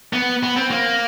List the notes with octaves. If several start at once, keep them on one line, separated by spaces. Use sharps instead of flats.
B3
B3
C4
A#3